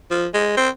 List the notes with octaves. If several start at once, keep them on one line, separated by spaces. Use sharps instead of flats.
F3
G#3
C4